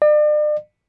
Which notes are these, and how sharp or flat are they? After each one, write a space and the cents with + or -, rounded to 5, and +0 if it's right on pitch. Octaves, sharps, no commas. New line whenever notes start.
D5 +40